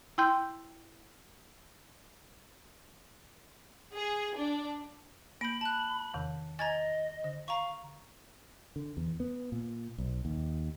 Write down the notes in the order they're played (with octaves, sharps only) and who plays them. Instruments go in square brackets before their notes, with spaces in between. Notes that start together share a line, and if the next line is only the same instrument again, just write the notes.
[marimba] E4 G5 C6 G6
[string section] G#4
D4
[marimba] A#3 G6 [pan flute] B5 [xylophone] D7
[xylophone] A5 F#6
[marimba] E2 C3 D#3
[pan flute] D#5 [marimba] G#5 [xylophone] A#5 G#6 A6
[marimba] D3
[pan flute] F5 [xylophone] A#5 C#6
[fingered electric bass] D3
E2
B3
A#2
B1
D#2